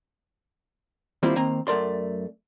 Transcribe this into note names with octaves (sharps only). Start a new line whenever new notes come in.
D#3 G3 A#3 C4 E4 F4
D#3 A#3 C4 A#5
F#2 A3 A#4 D5 C6